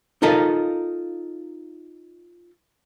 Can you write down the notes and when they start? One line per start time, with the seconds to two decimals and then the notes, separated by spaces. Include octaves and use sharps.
0.22 D#4 F4 A4 A#4 D#5 F5